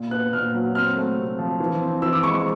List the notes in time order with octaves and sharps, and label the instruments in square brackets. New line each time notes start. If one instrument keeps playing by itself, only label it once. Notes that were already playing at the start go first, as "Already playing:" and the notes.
Already playing: [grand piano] A#2
B3 F#6
A#2 F6
F#3
C4 F6
A3
C3
F3
E3
C4
E3 E6
D6
G#3 C#6
C#6